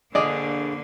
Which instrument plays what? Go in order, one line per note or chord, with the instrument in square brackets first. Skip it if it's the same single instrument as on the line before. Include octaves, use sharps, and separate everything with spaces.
[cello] D3 A#3 [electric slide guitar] D4 G#4 [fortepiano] D5 D#5